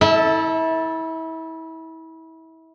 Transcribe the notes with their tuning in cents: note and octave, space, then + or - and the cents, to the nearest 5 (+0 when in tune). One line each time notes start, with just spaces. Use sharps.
E4 -30 A4 +0